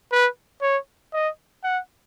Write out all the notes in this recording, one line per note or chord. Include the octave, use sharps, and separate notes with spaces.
B4
C#5
D#5
F#5